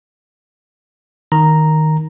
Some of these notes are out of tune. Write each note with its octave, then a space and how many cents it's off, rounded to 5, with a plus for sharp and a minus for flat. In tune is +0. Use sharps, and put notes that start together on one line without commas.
D#3 +0 A#5 +0